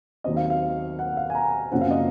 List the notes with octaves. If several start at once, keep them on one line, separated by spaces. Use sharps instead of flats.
D#2 D#3 F#3 C4 D#5
F5
F5
F#5
F5
G#5
A#5
F#1 F#2 C#3 F3 C4 F#5
F5
D#5